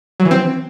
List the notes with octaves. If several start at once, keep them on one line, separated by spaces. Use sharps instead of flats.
F#3
E3
C4